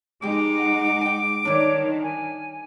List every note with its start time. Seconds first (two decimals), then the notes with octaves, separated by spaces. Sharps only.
0.22 F2 G#3 D#4 G4 D6
0.58 F#5
1.01 G5 G#5
1.45 D#3 G3 D4 C#5
2.02 G#5